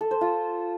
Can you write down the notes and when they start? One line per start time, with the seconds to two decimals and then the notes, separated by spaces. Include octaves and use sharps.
0.01 A4
0.11 C5
0.21 F4